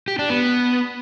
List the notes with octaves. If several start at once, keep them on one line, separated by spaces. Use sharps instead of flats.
G4
D4
B3